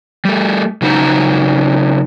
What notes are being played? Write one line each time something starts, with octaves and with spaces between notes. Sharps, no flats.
G3 A3
C#3 F#3 D#4 C5 F#5 A#5